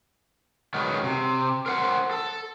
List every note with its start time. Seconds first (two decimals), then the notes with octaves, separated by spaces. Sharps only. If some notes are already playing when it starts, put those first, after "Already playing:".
0.74 D#3 F#3 G#3 B3
1.03 C3
1.66 A#4 C5 F#5
2.11 A4